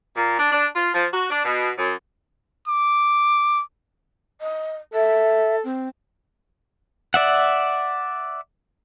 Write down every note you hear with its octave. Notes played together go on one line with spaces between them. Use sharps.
A#2
D4
D4
F4
F3
F#4
D4
B2
F#2
D6
D#5
A4 E5
C4
D5 E5 F#5